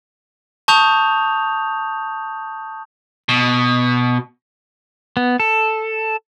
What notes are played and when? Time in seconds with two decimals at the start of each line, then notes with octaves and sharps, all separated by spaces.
0.68 A5 C#6 D#6 G6 F7
3.29 B2
5.17 B3
5.40 A4